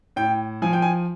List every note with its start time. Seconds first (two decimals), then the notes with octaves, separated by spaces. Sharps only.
0.16 A2 G5
0.62 F3 G#5
0.73 G5
0.82 G#5